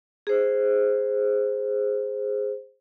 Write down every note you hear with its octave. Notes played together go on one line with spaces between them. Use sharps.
G#4 C5